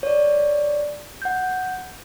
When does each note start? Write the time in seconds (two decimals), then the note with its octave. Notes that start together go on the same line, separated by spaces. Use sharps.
0.03 C#5 D5
1.22 F#5 G6